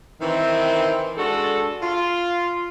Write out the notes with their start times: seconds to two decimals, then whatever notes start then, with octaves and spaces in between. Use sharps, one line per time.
0.21 D#3 E3 C4
1.18 G#3 D4 F#4 A4
1.82 F4